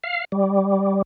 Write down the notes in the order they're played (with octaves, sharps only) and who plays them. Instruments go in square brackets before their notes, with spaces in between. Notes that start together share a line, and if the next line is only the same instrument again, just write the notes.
[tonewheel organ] F5
G3